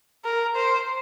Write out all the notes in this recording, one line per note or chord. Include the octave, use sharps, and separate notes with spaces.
A#4
C5